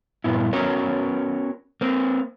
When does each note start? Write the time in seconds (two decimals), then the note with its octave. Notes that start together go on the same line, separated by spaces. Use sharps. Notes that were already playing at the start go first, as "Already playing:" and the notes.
0.24 G2 A#2 B3 E4
0.53 B3 C#4 F#4 A#4 C#5
1.81 A#3 C4